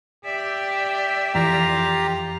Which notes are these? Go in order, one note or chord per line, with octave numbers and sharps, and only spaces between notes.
G4 D5 E5
F2 E3 F4 G4 A#5